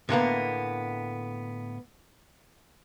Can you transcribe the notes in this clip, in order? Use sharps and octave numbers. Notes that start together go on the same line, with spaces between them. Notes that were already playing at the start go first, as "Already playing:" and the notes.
A2 D3 A#3 B3